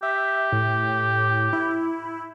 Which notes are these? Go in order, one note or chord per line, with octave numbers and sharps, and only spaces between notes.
G4 E5
A2
E4